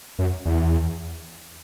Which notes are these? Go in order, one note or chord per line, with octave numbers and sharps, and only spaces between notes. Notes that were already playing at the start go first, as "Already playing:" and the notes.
F#2
E2